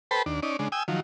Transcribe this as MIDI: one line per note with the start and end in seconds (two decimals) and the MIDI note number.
0.11 0.22 69
0.11 0.22 71
0.11 0.22 72
0.11 0.22 79
0.11 0.22 81
0.11 0.22 83
0.26 0.40 39
0.26 0.40 62
0.43 0.57 61
0.43 0.57 63
0.43 0.57 74
0.59 0.68 49
0.59 0.68 56
0.59 0.68 62
0.72 0.83 79
0.72 0.83 80
0.72 0.83 87
0.72 0.83 88
0.88 1.00 51
0.88 1.00 53
0.88 1.00 54